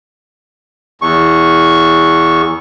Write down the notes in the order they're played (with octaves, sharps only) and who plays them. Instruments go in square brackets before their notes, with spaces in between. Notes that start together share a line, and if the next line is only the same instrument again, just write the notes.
[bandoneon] E2 C#6